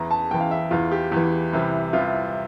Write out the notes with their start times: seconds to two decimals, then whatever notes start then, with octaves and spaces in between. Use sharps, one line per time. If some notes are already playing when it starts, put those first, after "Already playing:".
Already playing: E2 E3 A#5
0.11 A5
0.31 E2 E3 G5
0.40 F5
0.51 E5
0.71 E2 E3 F4
0.92 G4
1.12 E2 E3
1.53 C2 C3 E3
1.93 C2 C3 E3 F4